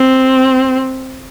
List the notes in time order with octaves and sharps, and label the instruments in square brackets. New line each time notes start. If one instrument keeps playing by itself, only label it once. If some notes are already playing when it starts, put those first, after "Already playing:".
Already playing: [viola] C4